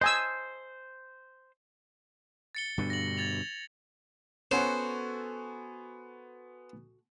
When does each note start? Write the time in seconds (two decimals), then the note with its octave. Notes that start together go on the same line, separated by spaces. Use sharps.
0.01 C5 D#5 G#5 E6
2.55 A6 C#7 G7
2.78 G2 B2 D3
2.90 A#6 F#7
3.17 G#6 A6 F7
4.51 B3 C#4 F#4 A4 C5 C#5 F#5 G#5